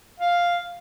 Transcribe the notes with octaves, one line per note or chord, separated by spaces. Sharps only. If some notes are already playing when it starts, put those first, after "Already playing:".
F5